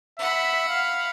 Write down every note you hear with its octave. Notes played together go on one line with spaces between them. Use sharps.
E5 F#5 B5
F5